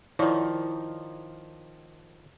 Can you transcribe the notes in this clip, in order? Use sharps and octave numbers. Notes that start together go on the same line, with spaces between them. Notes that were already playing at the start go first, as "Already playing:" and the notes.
D#3 F3 E4 C#5 D5